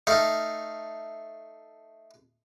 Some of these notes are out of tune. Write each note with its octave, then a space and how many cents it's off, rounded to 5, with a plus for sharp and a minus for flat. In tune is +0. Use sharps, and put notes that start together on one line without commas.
A3 +0 D#4 +0 F5 -10